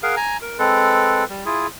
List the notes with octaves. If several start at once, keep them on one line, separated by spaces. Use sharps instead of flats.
G#4 A#4 F5 F#5
G#5 A#5
A#4
G#3 C4 A4 B4
G3
E4 F4 G#4